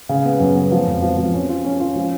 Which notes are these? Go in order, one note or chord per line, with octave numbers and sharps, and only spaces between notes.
C#3
B3
F#2
B3
F3
F2
F3
F3
C#4
F4
C#4
F4
F3